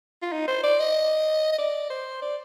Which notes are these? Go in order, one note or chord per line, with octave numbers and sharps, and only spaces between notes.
F4
D#4
C5
D5
D#5
D#5
D5
C5
D5